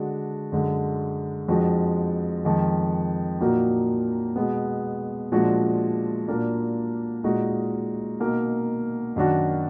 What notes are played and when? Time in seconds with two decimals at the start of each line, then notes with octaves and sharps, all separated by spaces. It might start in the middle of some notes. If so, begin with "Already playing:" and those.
Already playing: D3 G#3 D4 F#4
0.52 F#2 D3 G#3
1.48 F2 F3 G#3 D4 F#4
2.44 F2 D#3 G#3
3.40 A#2 F#3 A#3 D#4 F#4
4.36 B2 G#3 B3
5.32 A#2 F3 G#3 D4 F#4
6.28 A#2 F#3 A#3 D4
7.24 A#2 G#3 D#4 F#4
8.20 B2 A#3 D#4
9.16 F#2 D#3 F#3 D4 F#4